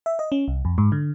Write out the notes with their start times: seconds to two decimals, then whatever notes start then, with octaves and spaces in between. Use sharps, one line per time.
0.06 E5
0.19 D#5
0.32 C#4
0.48 C2
0.65 F2
0.78 G#2
0.92 D3